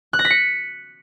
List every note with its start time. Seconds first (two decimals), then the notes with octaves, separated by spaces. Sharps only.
0.13 F#6
0.19 A#6
0.25 B6
0.30 C#7